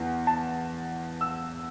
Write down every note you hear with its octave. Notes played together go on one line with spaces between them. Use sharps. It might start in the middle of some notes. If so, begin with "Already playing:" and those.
Already playing: E2
A5
E6